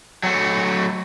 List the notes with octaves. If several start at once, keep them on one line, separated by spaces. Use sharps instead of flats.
F#3 A3